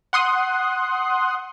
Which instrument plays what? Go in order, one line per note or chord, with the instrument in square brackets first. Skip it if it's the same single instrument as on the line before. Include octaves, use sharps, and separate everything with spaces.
[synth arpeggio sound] F#5 C6 D#6 F#6